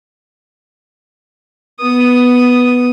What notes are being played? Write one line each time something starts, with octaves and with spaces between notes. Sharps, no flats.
B3 D#6